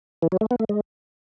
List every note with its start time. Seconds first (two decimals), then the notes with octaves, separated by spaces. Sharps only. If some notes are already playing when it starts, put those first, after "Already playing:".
0.23 E3
0.32 F#3
0.41 A3
0.51 B3
0.60 A3
0.69 G#3